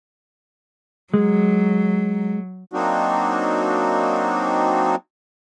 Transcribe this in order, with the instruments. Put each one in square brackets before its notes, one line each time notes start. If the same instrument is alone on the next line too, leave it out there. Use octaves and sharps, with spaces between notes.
[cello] F#3 [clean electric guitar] G#3
[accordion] F#3 A#3 C4 D4 D#4 F#4